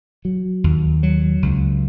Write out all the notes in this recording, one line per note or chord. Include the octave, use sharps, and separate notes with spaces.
F#3
D#2
F#3
C#2